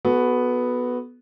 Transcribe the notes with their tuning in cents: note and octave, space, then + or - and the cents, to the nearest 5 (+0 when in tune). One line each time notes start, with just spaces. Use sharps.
B3 +0 F#4 +0 A4 -30